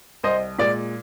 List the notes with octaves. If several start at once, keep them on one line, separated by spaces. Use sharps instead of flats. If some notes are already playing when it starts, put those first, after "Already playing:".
C2 C5 D#5
A#2 G#3 D5